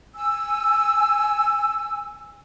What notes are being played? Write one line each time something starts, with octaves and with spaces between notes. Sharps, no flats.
G#5 E6